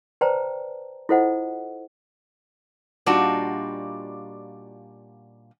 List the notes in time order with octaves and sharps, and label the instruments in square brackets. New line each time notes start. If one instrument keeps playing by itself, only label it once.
[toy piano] B4 C5 D5 G5 A5 A#5
E4 F4 A4 C5 D#5 F#5
[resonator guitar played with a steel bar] A#2 G3 D4 D#4 F4 F#4